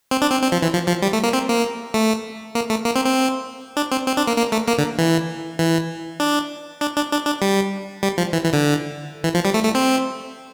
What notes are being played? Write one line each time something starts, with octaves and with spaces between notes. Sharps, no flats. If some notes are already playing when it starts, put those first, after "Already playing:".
C4
D4
C4
C4
F3
E3
F3
F3
G3
A3
A#3
C4
A#3
A3
A#3
A3
A#3
C4
C4
D4
C4
C4
D4
A#3
A#3
A3
A#3
D3
E3
E3
D4
D4
D4
D4
D4
G3
G3
F3
E3
E3
D3
E3
F3
G3
A3
A3
C4